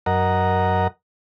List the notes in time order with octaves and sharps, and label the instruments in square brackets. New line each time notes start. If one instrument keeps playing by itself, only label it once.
[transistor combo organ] F#2 A#4 D#5 F#5 A#5